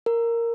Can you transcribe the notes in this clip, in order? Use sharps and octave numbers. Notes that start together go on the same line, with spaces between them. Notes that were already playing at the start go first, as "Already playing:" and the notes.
A#4